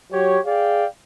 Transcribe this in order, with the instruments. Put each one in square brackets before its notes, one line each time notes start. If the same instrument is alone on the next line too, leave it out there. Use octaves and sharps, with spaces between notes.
[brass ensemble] F#3 G4 C#5
G#4 D5 F5 G5